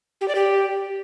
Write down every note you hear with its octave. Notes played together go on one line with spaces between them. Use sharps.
G4
D5
G4